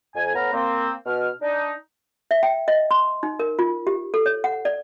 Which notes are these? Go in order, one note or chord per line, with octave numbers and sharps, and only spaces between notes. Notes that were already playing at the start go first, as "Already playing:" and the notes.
F2 G#5
A2 B3 B4 F5 A#5
A#3 C4
B2 F6
D4 D#4
E5
G5
D#5
C6
D#4
A#4
F4
G4
A4
C#5
F#5
D5